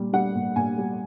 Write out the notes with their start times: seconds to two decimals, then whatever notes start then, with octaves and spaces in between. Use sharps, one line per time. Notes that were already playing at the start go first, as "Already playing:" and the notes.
Already playing: A#2 G3
0.13 G3 F#5
0.35 A#2
0.56 A#2 G#5
0.78 G3